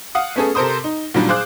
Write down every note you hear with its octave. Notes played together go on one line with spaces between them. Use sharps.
F5 F#5 D#6
A3 B3 C#4 G#4 A4
C3 A4 A#4 C5 C6 D#6
D#4
A#2 D#3 F#3 G3 D4
G#4 C5 F5 D6 F#6